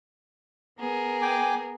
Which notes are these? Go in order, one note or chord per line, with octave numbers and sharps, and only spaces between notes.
B3 G#4 A#4
G5 G#5 D6